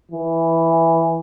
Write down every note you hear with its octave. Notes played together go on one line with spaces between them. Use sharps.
E3